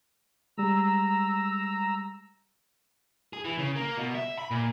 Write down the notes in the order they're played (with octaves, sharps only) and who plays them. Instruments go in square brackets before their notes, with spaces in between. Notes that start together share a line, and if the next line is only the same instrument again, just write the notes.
[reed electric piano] G3 G#3 [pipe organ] A#5 E6
[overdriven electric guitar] G#4
E3
C#3
A#3
B2
E5
B5
A#2